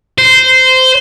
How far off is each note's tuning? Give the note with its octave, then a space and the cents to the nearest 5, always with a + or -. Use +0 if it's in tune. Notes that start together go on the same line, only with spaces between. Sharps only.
C5 -15